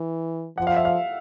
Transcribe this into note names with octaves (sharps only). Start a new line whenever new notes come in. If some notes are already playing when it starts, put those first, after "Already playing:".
Already playing: E3
F3 F#5
F5
E5
F5